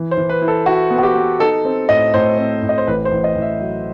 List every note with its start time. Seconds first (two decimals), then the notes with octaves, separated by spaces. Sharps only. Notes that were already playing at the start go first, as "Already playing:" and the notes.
Already playing: E3
0.11 C5
0.17 E3
0.29 B4
0.42 E4
0.48 A4
0.66 E4 F#4
0.91 B3
0.98 F#4
1.03 G4
1.15 B3
1.39 D#4 A4
1.65 C4
1.89 A2 D#5
2.14 A2 C5
2.38 C4
2.62 A2
2.69 D#5
2.78 C5
2.87 A1 B4
3.05 C5
3.12 A1
3.24 D#5
3.36 A1
3.42 E5
3.61 F#3